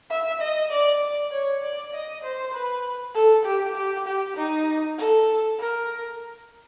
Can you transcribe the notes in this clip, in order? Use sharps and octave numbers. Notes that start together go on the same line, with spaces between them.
E5
D#5
D5
C#5
D5
D#5
C5
B4
A4
G4
G4
G4
D#4
A4
A#4